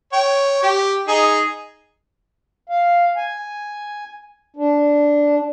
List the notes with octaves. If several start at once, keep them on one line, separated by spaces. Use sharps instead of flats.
C#5 G5
G4
D#4 G#4
F5
G#5
D4